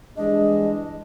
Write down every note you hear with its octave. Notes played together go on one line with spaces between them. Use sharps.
G2 E3 G#3 D4 D#5